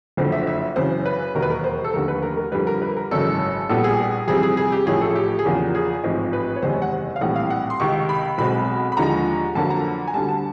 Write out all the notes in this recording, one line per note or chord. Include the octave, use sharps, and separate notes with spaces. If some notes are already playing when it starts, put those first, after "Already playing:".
F#1 F2 D3 C5
E5
E5
F#2 C#3 E3 C5
B4
E1 D#2 D#3 F#3 A#4
B4
A#4
C5
A4
F1 D#2 D3 A#4
B4
A#4
A#4
F2 D3 G3 B4
A#4
B4
A#4
G#1 F#2 C#3 E3 G#3 A4
A#1 A#2 G3 B3 A4
G#4
F2 C3 E3 G3 C4 G#4
G#4
G#4
G4
A1 A2 F3 A3 C#4 G#4
A4
G4
G#4
E2 C#3 F3 A#3 G4
G#4
A1 G#2 F3 G#3 C4
B4
C#5
F#1 E2 C3 D#3 G#3 C5
C#5
F#5
F5
A#1 A2 E3 G3 C4 F#5
F5
F#5
C6
C#2 C3 D#3 C#6
B5
B1 B2 G#3 C4 B5
B5
D#2 D3 F3 G#3 A#5
F2 D3 F#3 A#3 A5
A#5
G#5
D2 D3 G3 A5
A5